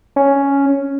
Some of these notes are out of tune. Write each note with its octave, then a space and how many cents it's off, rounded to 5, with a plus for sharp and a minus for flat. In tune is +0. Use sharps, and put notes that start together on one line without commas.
C#4 +5